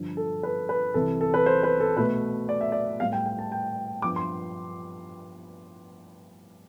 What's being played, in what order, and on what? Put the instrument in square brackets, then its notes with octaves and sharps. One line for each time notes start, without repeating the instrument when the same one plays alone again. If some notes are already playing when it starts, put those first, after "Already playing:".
Already playing: [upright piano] G2 D3 F3
A4
B4
B4
C2 C3 E3 A4
A4
B4
C5
B4
A4
B2 A3 B4
D5
E5
D5
A2 G3 B3 F5
G5
G5
A5
G5
G2 F3 B3 D6
C6